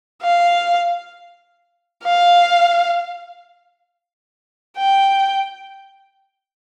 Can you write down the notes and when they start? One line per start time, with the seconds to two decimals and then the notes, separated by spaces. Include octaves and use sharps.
0.23 F5
2.04 F5
4.77 G5